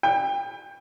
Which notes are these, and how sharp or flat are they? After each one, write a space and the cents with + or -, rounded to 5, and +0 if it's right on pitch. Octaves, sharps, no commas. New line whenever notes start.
G5 +25